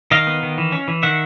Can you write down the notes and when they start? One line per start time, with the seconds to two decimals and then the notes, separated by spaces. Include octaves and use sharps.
0.11 D#3 D#5 F5
0.27 B3
0.43 D#3
0.58 E3
0.72 C#4
0.88 E3
1.03 D#3 E5 F#5